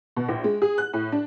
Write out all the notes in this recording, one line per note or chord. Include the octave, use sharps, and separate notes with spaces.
B2
A#1
G#3
G#4
F#6
A2
D4